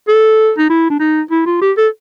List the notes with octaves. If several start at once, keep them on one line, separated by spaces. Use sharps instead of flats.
A4
D#4
E4
D4
D#4
E4
F4
G4
A4